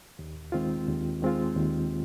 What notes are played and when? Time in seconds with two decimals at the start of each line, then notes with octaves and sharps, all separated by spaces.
0.19 D#2
0.52 D#3 G#3 C4 F4
0.88 D#2
1.22 D#3 G#3 C4 F4
1.56 D#2